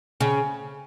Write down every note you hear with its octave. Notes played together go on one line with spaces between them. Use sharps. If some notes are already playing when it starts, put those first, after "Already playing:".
C#3